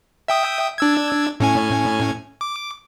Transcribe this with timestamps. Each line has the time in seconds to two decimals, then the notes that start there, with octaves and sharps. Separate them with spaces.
0.28 E5 G5 D#6
0.78 D4 E6 G#6
1.40 A2 C#4 G#5
2.41 D6